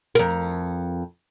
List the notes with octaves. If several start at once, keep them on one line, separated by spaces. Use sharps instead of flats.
F2 A#4